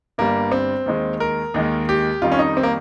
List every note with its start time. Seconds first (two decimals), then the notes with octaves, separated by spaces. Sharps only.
0.18 G1 G2 G3 A#3
0.52 C4
0.86 D#2 D#3 G#3
1.20 A#4
1.54 D#2 D#3 G#3
1.89 G4
2.22 F2 D#3 G3 F4
2.32 C#4
2.39 D#4
2.57 C4
2.63 A#3